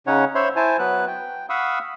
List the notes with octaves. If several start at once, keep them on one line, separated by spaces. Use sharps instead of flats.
C#3 C#4 D#4 C#5 F#5
C5 C#5 E5 B5 C6
E4 C5 G#5 A5
F#3 B3 B4 F#6
G5
F5 F#5 B5 C#6 D#6 E6